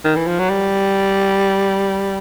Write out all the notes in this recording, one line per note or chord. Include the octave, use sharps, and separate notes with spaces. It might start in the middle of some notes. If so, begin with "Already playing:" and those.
D#3
E3
F3
F#3
G3